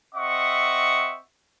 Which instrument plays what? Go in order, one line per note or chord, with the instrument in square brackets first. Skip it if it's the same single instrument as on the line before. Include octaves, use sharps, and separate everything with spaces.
[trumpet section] C4 D#5 E5 F#5 C#6